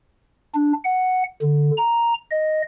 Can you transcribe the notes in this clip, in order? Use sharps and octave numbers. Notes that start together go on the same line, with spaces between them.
D4
F#5
D3
A#5
D#5